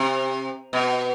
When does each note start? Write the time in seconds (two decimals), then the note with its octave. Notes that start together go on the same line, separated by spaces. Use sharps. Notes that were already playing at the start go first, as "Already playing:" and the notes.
Already playing: C3
0.73 B2